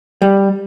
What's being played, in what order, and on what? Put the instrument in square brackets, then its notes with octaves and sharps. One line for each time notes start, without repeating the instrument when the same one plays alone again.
[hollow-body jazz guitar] G3